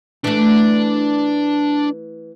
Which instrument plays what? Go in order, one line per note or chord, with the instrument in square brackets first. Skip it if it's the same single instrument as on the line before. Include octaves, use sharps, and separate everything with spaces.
[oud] E3 A3 [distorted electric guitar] D4